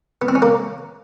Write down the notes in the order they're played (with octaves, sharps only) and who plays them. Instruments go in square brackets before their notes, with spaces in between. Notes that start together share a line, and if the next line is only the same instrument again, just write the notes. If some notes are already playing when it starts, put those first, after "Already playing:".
[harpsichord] B3
C4
C#4
A#3